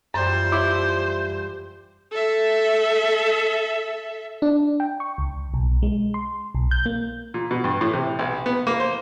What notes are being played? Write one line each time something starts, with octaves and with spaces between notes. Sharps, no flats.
F#2 E3 F3 G3 C5
E4 D6
A4 E5
D4
G5
C#6
C#2
B1
G#3
C6
B1
G6
A#3
A#2
B2
G2
A2
C3
B1
B3
A#3
C5